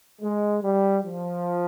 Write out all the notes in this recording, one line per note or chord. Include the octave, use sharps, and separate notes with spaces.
G#3
G3
F3